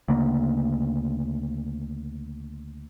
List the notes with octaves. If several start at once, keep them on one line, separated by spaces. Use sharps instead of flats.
D2 C#3 A#3